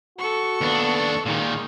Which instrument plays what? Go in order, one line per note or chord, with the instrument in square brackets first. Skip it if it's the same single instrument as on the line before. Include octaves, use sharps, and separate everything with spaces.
[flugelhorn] F#4 [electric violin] A4 C#6
[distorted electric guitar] D#2 D4 [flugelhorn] B3
[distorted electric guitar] A#2 D#3 [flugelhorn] G#3 [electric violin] A#3 D#4